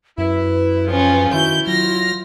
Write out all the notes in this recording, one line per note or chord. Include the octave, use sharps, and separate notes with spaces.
F#2 E4 B4
F2 C#3 F3 C#4 F4
D#3 E4 F#4 G6
F#3 F4 F6 A#6